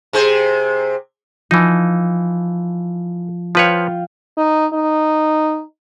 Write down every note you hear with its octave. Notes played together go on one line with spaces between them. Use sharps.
C3 G#4 C5
E3 F3 D#4
F3 F4 B4 C#5 F5 G5
D#4
D#4